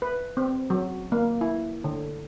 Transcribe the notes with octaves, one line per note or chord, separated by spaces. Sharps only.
B4
C4
F#3
A#3
E4
D3